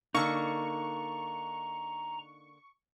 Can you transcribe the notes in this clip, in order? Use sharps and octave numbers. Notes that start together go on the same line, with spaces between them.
D3 A#3 D#4 A#5 C#6